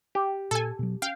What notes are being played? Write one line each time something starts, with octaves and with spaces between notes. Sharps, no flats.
G4
A#2 A4 G#5
B2 F#3
C#4 F5 G5